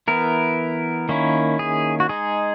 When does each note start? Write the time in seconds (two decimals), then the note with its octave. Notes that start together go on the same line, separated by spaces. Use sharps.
0.08 E3 B3 E4 A#4
1.09 D#3 A#3 C#4 E4
1.59 G#4
2.00 F#4
2.09 G#3 D#4 G#4